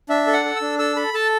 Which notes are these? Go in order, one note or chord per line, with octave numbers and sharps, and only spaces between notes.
D4 E5
A4
F#5
A4
E6
D4
A4 E6
A4 B5
A4 A5